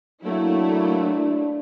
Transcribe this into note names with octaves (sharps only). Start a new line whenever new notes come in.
F#3 A3 A#3 D4 E4